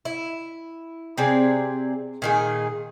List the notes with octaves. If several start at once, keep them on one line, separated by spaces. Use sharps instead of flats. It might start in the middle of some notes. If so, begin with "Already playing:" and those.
E4
C3 C4 G#4 D5
A#2 D#3 G#4